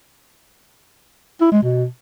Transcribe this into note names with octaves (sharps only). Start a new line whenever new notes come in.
E4
G#3
B2